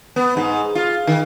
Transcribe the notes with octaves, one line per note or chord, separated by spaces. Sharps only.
B3
G#2
F4
D#3